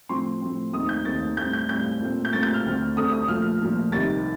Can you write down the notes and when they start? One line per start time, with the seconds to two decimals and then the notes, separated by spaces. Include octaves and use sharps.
0.09 A2 F3 C4 C6
0.41 A2 F3 C4
0.73 D#2 D#3 A3 C4 D#6
0.89 G6
1.05 D#2 D#3 A3 C4 A6
1.37 A2 G3 C4 G6
1.53 G6
1.68 A2 G3 C4 G6
2.01 A#2 A3 C4
2.25 G6
2.33 A#2 A3 C4 A6
2.43 G6
2.54 F6
2.65 D2 D3 A3 C4
2.96 D2 D3 A3 C4 D#6
3.13 D#6
3.28 A#2 F3 A3 F6
3.61 A#2 F3 A3
3.92 C2 C3 D#3 A6